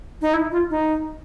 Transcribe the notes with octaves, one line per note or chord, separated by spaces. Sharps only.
D#4
E4
F4
D#4